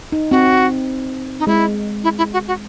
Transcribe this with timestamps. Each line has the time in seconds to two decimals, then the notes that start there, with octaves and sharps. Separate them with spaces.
0.12 D#4
0.31 C4 F#4
1.39 D#4
1.47 G#3 E4
2.04 E4
2.18 E4
2.33 F#4
2.48 F#4